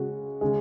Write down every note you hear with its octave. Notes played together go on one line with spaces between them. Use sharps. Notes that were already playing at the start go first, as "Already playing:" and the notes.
Already playing: C#3 G#3 F#4
C#3 G#3